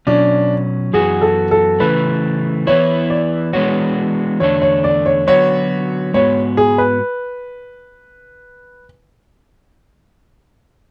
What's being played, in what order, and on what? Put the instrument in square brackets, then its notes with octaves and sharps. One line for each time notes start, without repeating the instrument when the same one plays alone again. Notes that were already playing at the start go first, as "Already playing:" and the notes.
[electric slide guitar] B2 F#3 C#4 [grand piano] D4
[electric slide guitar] F#2 E3 B3 F#4 [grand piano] G#4
[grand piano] A4
A4
[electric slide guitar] C#3 E3 A3 [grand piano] B4
[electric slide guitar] E3 B3 E4 [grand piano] C#5
[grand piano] D5
[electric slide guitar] E3 G#3 B3 D4 F#4 [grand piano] C#5
[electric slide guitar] E2 D3 A3 D4 [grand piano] C#5
[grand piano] C#5
D5
C#5
[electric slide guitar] D3 F#3 B3 F#4 [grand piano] C#5
[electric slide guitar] G#2 G#3 B3 F#4 [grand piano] C#5
[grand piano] G#4
B4